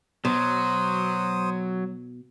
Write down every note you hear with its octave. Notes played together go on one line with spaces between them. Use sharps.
B2 F#3 C5 D#6